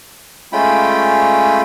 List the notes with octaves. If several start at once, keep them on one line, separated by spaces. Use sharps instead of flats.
G#3 A3 C#4 F4 G5 B5